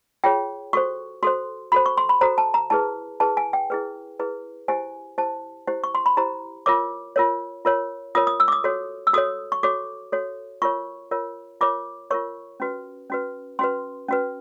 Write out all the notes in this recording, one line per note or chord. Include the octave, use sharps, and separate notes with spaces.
F4 G#4 C#5 G5
F#4 A4 C5 C#6
F#4 A4 C5 C6
F#4 A4 C5 B5
C#6
C6
B5
F#4 A4 C5 A#5
A5
A#5
E4 G#4 B4 A5
E4 G#4 B4 A5
G#5
G5
E4 G#4 B4
E4 G#4 B4
E4 G4 C5 G#5
E4 G4 C5 A5
E4 G4 C5
C#6
C6
B5
E4 G4 C5 A#5
F4 A#4 C#5 D6
F4 A#4 C#5
F4 A#4 C#5
F4 A#4 C#5 D#6
D#6
E6
D6
D#6
F#4 A4 C#5
E6
F#4 A4 C#5 D#6
C#6
F#4 A4 C#5 D6
F#4 A4 C#5
F4 A#4 C#5 C#6
F4 A#4 C#5
F4 A#4 C#5 D6
F4 A#4 C#5 C#6
C#4 F#4 B4
C#4 F#4 B4
C#4 F#4 B4 C6
C#4 F#4 B4